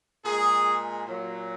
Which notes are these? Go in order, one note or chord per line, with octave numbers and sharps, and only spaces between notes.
A#2 G#3 G#4
A#2 F#3